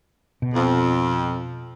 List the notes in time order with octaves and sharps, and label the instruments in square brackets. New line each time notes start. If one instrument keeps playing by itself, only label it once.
[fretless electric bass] B2
[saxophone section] F2